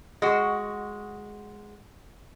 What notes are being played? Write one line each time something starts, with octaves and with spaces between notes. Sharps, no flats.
G#3 F#4